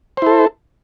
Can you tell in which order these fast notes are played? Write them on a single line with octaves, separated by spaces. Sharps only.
C5 E4 A4